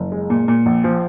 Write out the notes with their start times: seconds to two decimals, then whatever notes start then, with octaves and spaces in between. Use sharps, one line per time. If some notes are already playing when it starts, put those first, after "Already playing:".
Already playing: F#1
0.12 G#3
0.30 A#2
0.48 A#2
0.66 A#1
0.84 F3